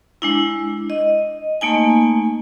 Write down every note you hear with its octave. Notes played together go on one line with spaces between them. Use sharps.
G#3 D4 E4
D#5
A3 A#3 D#4 G#5